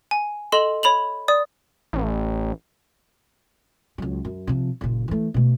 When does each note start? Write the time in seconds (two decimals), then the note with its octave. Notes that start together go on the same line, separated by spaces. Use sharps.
0.11 G#5
0.52 A4 D#5 C6 E7 F#7
0.83 C#5 B5 F7 F#7
1.28 D5 D#6
1.93 A1
3.98 C#2 F#3
4.25 F#2
4.47 C3 F3
4.81 F#1 A#2
5.08 E3 A3
5.34 B2 A3